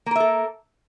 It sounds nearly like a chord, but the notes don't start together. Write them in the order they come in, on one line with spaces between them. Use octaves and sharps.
A#3 A#4 E5 A4